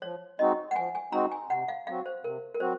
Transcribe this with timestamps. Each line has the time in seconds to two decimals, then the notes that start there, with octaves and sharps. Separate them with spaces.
0.02 F3 C#5
0.39 G#3 C4 D#4 F#4 D#5
0.71 F#5
0.76 F3 G#5
0.95 G#5
1.12 G#3 C4 D#4 F#4 A#5
1.32 G#5
1.50 C3 F#5
1.68 F5
1.87 F#3 C4 F#4 F5
2.06 C5
2.24 C3 A#4
2.54 A#4
2.60 F#3 C4 F#4 C5